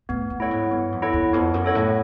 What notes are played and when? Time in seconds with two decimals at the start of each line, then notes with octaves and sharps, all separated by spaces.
0.09 A2 B3
0.30 A2
0.40 E4 A4 C#5 F#5
0.51 G#2
0.71 G2 B3
0.92 F2
1.02 E4 A4 C#5 F#5
1.13 E2
1.33 F2 B3
1.54 F#2
1.64 E4 A4 C#5 F#5
1.75 A2